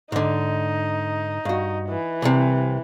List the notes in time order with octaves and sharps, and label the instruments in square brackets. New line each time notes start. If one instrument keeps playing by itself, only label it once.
[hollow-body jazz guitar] G#2 D3 [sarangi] D#4
[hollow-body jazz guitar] G2 F#4
[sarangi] E3
[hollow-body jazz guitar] C2 A2 C3